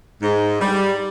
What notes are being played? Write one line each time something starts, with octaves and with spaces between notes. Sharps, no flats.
G#2
G3